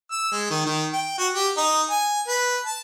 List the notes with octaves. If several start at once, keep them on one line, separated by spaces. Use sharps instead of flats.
E6
G#3
D#3
D#3
G5
F#4
G4
D#4
G#5
B4
A5